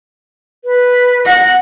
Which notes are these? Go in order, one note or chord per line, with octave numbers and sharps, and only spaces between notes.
B4
F#5 A#6